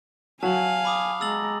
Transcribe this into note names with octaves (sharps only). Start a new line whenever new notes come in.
F#3 F5 G#5 A5 F#7
B5 D6 D#6
G#3 A#5 E6 A6 F#7